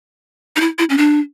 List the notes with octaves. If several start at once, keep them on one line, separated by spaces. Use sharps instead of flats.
D#4
E4
E4
C#4
D4